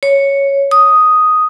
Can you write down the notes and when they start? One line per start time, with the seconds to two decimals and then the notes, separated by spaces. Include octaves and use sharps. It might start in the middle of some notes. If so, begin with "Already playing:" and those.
0.03 C#5
0.71 D#6